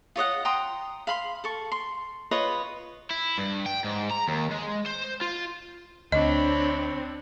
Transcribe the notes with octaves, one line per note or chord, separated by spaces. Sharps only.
F4 C#5 D#5 F#5
G5 A#5 C6 D#6
F5 B5 C6
A4 C#6
C6
F4 B4 C#5 D#5
E4
G2
G5
G#2
A#5
D#2
G#3
C5
F4
D2 C4 D4 C#5 D#5 B5